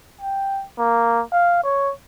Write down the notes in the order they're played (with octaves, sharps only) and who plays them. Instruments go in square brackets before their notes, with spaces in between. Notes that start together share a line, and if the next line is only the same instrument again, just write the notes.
[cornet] G5
A#3
F5
C#5